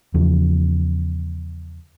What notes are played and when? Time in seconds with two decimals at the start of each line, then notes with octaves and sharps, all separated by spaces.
0.14 E2 C#3 F3